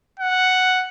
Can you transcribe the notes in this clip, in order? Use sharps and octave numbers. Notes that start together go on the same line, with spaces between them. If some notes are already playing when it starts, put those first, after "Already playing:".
F#5